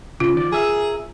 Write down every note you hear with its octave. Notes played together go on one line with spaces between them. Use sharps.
C#3 F4
D#3 F3 D5
G#4 A#4 E5